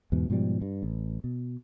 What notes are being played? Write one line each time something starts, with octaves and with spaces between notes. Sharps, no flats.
E2 G#2 B2
G#2 B2 F3 G3
G2
A1
B2